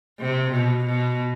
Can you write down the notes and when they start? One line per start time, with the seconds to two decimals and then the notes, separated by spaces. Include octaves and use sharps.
0.20 C3
0.52 B2
0.85 B2